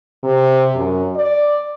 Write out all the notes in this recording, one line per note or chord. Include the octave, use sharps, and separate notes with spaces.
C3
F#2
D5